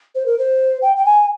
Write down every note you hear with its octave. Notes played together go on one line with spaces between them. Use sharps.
C5
A#4
C5
G5
G5
G#5